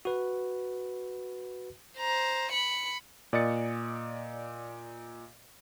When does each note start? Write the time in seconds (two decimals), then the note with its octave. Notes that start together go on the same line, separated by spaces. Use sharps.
0.05 F#4 B4
1.99 C5 A#5
2.51 B5 C#7
3.33 A#2 D5 D#5 D#6 A6 C#7